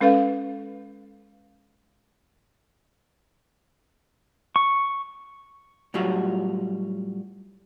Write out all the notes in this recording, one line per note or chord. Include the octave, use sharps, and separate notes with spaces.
G#3 C#4 A4 B4 F5
C#6
A2 F#3 G3 F4 F#4